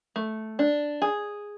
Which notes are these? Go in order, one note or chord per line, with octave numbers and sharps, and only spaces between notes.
A3
D4
G#4